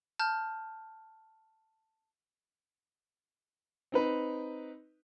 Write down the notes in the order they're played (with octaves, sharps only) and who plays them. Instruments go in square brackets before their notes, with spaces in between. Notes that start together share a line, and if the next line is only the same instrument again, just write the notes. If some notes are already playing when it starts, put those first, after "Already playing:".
[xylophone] A5 F6 G6
[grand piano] C4 D#4 B4